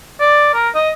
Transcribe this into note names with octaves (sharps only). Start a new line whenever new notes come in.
D5
A#4
D#5